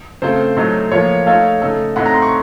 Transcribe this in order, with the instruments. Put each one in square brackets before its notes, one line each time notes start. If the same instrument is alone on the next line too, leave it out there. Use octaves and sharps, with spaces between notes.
[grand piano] C#3 A3 C4 F4 A4 [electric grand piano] C5
[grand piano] A2 F#3 A3 D#4
[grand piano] A2 F3 A#3 F4 [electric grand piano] C#5
[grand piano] A3 D#4 A4 C#5 [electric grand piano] F5
[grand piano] C#3 A3 D#4 A4
[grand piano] A2 A3 C4 D#4 [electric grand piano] F#5
[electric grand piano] A#5
C6
C#6